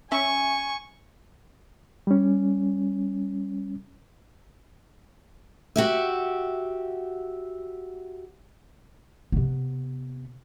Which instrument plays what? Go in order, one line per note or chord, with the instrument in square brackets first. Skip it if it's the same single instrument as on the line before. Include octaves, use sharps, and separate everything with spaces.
[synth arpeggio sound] C#4 E5 [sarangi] G#5 [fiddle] C#6
[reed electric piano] G3 C#4
[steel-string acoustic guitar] F#4 G4 E5
[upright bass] C3 B3